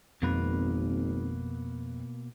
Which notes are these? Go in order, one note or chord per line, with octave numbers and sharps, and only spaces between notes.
G#1 F2 B2 A#3 B4